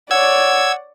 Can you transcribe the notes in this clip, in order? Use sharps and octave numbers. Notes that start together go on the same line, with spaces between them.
C#5 D5 F#5 E6 G#6